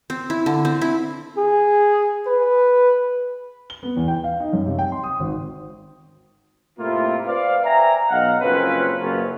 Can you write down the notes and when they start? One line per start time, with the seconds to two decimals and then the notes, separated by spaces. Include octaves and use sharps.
0.10 C4
0.30 E4
0.46 D3
0.65 C4
0.82 E4
1.38 G#4
2.27 B4
3.70 G7
3.83 B3
3.96 E2
4.08 G5
4.24 F5
4.40 D#4
4.53 F#2
4.66 C3
4.79 G5
4.92 C6
5.04 D#6
5.20 G#1
6.78 A2 C3 A#3 E4 F4
7.27 B4 C5 D5 F5
7.65 E5 G5 G#5 A#5
8.10 B1 D#5 F5 F#5
8.42 F#1 F3 A#3 C4 C#4 B4
9.00 F#1 F#2 F#3 C#4 F4